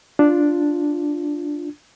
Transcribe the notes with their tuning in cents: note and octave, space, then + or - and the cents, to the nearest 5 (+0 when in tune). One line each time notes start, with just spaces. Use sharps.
D4 +0 F4 +0